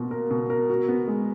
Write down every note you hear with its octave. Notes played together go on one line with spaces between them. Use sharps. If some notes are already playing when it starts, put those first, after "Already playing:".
Already playing: B2 A#3 F4 A#4
A#4
B2
A#4
F#4
B3
G#3